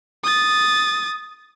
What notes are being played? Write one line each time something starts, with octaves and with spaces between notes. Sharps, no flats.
D#6 A6